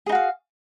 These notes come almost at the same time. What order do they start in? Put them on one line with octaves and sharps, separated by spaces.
G#4 D#4 F#4 F5